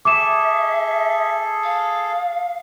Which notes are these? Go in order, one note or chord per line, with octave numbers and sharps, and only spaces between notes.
G#4 A4 E5 D6 E7
F5